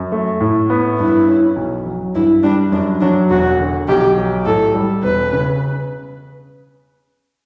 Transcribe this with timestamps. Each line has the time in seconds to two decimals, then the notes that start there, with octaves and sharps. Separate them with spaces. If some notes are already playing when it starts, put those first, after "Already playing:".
Already playing: F#2
0.12 A3
0.41 A2
0.70 B3
0.99 G2 E4
1.28 C#4
1.56 B1
1.86 F#3
2.15 G2 E4
2.43 G3 D4
2.72 F#2 D4
3.01 F#3 D4
3.30 E1 F#4
3.59 D3
3.88 B1 G4
4.17 F#3
4.46 A2 A4
4.75 G3
5.03 E1 B4
5.33 C#3